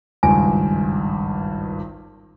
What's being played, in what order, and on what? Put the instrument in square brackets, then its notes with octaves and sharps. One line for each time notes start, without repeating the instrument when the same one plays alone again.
[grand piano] G#1 C#2 G2 [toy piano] G#5